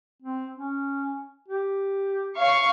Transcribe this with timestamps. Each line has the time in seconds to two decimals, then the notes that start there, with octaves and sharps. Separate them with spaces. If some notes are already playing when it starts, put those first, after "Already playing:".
0.22 C4
0.56 C#4
1.48 G4
2.39 C#5 F5 C#6